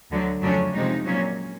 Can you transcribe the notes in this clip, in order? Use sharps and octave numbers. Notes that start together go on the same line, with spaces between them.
D2 D3 F#3
F2 C#3 F#3 A3 C#4 D4
C3 F3 G#3 D#4
A#2 F#3 A#3 C#4